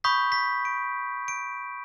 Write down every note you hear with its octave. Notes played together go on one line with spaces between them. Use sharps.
B5 C#6 D#6 G6 B6
B6
D7
D7